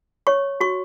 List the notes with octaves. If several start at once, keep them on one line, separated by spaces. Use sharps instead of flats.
C#5 C#6
F#4 C#6